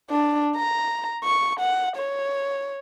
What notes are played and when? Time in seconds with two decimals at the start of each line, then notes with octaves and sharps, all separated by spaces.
0.10 D4
0.56 A#5
1.24 C#6
1.60 F#5
1.96 C#5